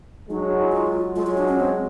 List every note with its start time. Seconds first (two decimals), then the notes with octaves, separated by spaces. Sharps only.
0.29 F#3 G#3 D#4
0.40 D4
0.51 D#4
0.62 E4
0.72 F4
1.15 F#3 G#3 F4
1.27 F4
1.38 D4
1.48 C#4
1.60 C4